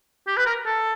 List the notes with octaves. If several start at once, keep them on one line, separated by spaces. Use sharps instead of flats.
G4
B4
A#4
A4